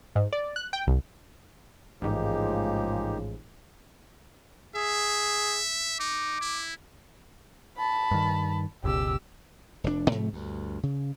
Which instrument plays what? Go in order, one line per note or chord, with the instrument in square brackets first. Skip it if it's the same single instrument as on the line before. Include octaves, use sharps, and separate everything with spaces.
[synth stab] G#2
D5
F#6
G5
C2
[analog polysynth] A1 G#2 [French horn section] C#3 F3 G#3 [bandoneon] A#3 D#4 G4
[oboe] G#4 [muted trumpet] E5
[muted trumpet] D#4 [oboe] D6
[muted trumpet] E4
[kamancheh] A5 B5
[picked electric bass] G2 D#3
[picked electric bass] F#1 C#2 B2 [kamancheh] G4 E6
[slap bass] F1 F2 B2 D4
G#2 C3 F3 A3
D2 G2
C#3